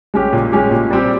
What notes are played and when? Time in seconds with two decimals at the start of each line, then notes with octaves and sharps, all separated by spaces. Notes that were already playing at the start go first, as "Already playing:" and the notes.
0.14 G#3 C#4 G4
0.33 A#2
0.52 G#3 C#4 G4
0.71 A#2
0.90 G3 C4 G4